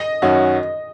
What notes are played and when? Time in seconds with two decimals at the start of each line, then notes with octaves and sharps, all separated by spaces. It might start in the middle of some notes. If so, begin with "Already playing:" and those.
Already playing: D#5
0.22 F#2 D#3 F#3 C#4 F#4